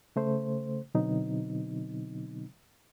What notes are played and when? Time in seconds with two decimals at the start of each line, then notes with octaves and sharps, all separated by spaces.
0.16 C#3 A3 C5
0.95 B2 D3 F#3 B3 C4 D#4